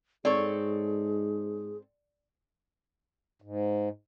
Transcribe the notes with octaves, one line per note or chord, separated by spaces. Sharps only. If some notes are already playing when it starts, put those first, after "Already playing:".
G#2 C4 G#4 A4 C#5 D5
G#2